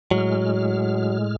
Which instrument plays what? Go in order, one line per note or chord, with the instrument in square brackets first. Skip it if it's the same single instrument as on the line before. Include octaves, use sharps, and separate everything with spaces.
[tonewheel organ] A2 G#3 F6 [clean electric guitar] F#3